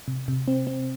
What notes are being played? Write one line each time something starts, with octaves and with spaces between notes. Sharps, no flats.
C3
C3
C4
C4